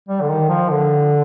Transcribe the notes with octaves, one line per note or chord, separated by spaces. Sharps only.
G3
D3
D#3
F3
D3